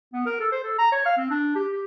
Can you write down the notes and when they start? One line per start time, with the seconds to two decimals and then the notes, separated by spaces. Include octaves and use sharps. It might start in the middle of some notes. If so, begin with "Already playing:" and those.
0.14 B3
0.26 A#4
0.40 A4
0.52 C5
0.64 A4
0.79 A#5
0.92 C#5
1.06 F5
1.17 C4
1.31 D4
1.56 G4
1.72 G4